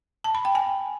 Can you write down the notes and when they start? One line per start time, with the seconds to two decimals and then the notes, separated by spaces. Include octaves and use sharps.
0.24 A5
0.35 B5
0.45 G5
0.55 G#5